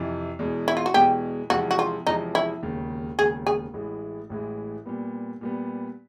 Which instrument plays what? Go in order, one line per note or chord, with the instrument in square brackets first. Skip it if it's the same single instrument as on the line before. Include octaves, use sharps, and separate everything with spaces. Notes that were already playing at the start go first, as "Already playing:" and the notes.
Already playing: [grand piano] F2 C3 E3
E2 B2 G#3
[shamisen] E4
F4
F#4
[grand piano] E2 B2 G#3 [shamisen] G4
[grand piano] E2 C3 F3 G#3 [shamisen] F#4
[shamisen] F#4
F4
[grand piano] E2 C3 F3 G#3 [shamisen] D#4
[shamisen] E4
[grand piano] E1 D#2 C#3
[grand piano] E1 D#2 C#3 [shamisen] G#4
[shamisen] G#4
[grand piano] A1 A2 E3 G#3
A1 A2 E3 G#3
A#2 G3 B3
A#2 G3 B3